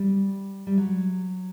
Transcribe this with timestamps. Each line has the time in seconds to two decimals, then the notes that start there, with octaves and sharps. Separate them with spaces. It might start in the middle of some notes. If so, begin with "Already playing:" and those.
Already playing: G3
0.67 G3
0.78 F#3